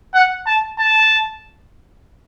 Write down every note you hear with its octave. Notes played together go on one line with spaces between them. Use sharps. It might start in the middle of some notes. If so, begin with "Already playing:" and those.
F#5
A5
A5